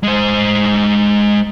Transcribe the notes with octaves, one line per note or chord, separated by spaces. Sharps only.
G#3 C5